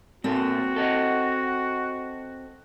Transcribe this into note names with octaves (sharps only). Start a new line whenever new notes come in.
A#2 C4 F#4 A4
A4 D#5 F#5